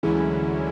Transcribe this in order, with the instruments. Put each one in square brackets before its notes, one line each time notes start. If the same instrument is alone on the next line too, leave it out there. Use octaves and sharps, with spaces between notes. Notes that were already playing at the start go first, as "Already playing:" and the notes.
[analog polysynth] D2 D3 F#3 C#4 E4 [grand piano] E3 G#3